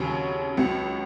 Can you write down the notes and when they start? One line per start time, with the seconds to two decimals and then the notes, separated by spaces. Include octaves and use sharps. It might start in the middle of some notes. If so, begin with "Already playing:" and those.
Already playing: D#2 C#3 F#3 C#4
0.57 C#2 C#3 F#3